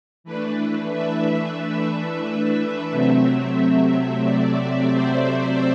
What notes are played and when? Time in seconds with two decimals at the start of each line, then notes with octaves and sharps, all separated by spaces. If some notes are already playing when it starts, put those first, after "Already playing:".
0.24 E3 A3 D4 B4
0.92 E5
2.91 C3 F#3 A3 C4 E5
4.24 D5
4.92 C5